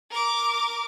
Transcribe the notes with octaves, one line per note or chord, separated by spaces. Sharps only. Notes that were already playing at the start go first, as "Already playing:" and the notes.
A#4 D6